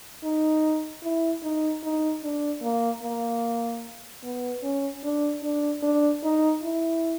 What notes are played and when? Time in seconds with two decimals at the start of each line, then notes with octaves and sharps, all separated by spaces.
0.24 D#4
1.03 E4
1.43 D#4
1.83 D#4
2.23 D4
2.63 A#3
3.03 A#3
4.23 B3
4.62 C#4
5.04 D4
5.43 D4
5.83 D4
6.23 D#4
6.63 E4